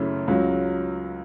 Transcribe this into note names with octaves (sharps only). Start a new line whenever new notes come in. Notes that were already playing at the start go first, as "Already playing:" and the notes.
Already playing: F#2 C#3 A3 C#4 E4
C#2 C#3 F#3